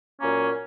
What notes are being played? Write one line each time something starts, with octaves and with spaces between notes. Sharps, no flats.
A#2 F#3 A#3 C#4